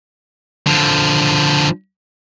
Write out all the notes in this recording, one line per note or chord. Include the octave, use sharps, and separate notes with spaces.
D3 F3